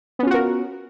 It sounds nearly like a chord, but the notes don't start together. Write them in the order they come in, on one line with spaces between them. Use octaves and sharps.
B3 C#4 F4 F#4 A#4